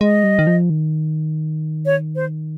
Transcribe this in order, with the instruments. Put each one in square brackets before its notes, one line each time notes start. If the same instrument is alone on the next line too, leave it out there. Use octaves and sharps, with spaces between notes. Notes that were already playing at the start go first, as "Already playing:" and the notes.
[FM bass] G#3 [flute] D#5
[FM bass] G3
D#3
F3
D#3
[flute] C#5
C5